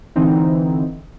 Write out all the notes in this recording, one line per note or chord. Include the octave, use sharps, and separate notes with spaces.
D3 E3 C4 D#4